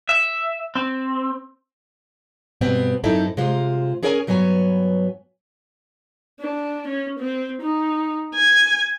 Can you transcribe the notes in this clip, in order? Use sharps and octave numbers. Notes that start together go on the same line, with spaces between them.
E5
C4
G2 B2 B3 C4
F#2 C4 D#4 E4 A4
C3 G#3 F4 C5
C#4 G#4 A#4 C#5 F#5 G#5
G2 F#3 B3 C#5 G#5
D4
C#4
C4
D#4
G#5